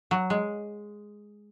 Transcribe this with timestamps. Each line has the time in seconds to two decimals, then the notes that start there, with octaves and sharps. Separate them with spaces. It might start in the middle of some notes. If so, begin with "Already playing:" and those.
0.11 F#3
0.30 G#3